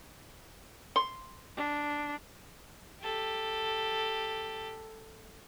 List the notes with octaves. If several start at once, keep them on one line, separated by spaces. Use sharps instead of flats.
C6
D4
G4 A4